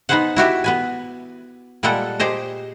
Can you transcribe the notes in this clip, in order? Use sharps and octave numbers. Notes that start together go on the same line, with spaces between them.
B3 D#4 G#4 B4 C5 F#5
E4 F#4 G4 E5
B3 B4 G#5
A#2 G3 G#3 A#3 A4 F#5
G4 G#4 C5 D#5